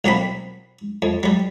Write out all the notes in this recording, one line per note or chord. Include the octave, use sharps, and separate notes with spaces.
B1 F#3 A#3 C4 B5
F2
F#3 G3